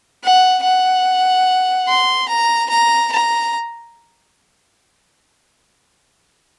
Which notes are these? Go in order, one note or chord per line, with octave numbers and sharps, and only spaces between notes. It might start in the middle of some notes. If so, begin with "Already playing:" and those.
F#5
F#5
C6
A#5
A#5
A#5